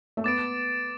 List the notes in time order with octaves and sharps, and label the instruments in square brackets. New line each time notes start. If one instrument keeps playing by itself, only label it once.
[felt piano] A3
[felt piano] B3 [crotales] D6 A6 D7